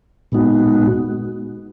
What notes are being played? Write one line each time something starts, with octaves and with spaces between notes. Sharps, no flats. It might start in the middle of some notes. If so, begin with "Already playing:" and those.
A#2 G#3 B3 D#4 F#4